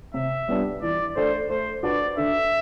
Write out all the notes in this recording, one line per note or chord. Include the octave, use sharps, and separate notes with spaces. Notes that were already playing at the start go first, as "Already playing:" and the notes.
C3 E5
G3 B3 D4 G4
E3 D5
A3 D4 A4 C5 D5
A3 C5
D4 F#4 B4 D5
D3 E5